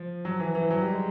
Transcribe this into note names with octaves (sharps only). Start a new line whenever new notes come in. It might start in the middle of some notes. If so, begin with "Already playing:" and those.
Already playing: F3
F#3
E3
E3
F#3
G3
G#3